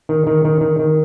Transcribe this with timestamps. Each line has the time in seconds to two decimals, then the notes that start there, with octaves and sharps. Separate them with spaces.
0.09 D#3
0.27 D#3
0.45 D#3
0.61 D#3
0.79 D#3